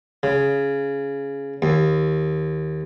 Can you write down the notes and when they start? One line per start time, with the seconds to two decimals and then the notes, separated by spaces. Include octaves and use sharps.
0.23 C#3
1.62 D#2